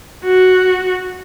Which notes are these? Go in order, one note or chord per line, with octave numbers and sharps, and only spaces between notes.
F#4